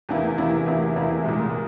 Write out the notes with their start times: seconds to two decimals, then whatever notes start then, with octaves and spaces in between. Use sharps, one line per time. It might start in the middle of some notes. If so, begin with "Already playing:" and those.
0.09 E2 C3 E3 A#3 E4
0.37 E2 C3 E3 A#3 E4
0.66 E2 C3 E3 A#3 E4
0.96 E2 C3 E3 A#3 E4
1.25 C2 A#2 G#3